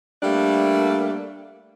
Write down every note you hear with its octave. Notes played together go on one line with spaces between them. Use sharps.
G3 A3 A#3 D4